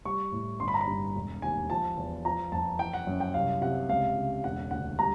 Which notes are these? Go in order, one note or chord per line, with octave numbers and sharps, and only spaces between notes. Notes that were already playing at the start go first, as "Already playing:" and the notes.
G3 C#6
A2
G1 C6
B5
A#5
B5
G2
E1
D#2 G#5
F3 A5
E2
F3 A#5
F2 A5
E3 G5
F#5
F#2
G5
C2 F5
C3 F#5
C#2 F5
C#3
E1 F#5
D2 F#5
G3 A#5